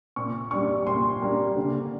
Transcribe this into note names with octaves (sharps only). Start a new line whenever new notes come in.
A#2 C#6
G3 A#3 D4 C#6
A#2 C6
G3 A#3 D4
D3